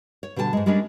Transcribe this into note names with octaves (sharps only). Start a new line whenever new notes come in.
C#5
B2 D3 G3 G#5 A5
G#2 G#3
G3 G#3 A#3 C#4 D4